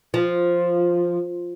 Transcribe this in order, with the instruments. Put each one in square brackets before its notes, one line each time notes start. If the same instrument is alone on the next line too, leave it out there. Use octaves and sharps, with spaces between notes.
[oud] F3